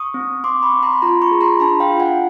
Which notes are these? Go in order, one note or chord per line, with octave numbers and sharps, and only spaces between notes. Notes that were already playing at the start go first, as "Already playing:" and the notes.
Already playing: C#6 D#6
C4
C4 C6 D6
B5 C#6
C4
A#5 C6
B5
F4 A#5 C6
B5 C#6
G#4
A#5 C6
D4 A5 B5
F5 G5
F4
F#5 G#5